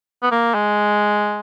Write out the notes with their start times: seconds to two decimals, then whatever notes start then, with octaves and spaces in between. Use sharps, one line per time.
0.22 B3
0.31 A#3
0.54 G#3